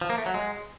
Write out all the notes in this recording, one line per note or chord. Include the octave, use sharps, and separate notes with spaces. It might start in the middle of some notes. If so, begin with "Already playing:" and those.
F3
A#3
A3
F#3
G#3